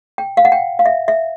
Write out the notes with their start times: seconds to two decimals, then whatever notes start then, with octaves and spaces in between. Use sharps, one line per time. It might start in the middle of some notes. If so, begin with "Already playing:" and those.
0.18 G5
0.37 F5
0.45 F#5
0.52 G5
0.79 F5
0.86 E5
1.08 E5